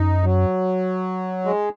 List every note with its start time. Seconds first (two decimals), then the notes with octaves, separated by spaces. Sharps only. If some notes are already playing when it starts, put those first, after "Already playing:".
Already playing: F#2 D#4
0.24 F#3
1.45 G#3